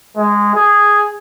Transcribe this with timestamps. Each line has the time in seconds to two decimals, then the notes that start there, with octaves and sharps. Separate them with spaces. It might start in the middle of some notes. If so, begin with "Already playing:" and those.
0.17 G#3
0.55 G#4